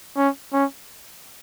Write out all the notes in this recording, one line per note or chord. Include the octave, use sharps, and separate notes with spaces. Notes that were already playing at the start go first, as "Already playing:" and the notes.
C#4
C#4